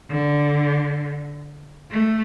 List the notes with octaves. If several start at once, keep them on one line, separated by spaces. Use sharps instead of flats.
D3
A3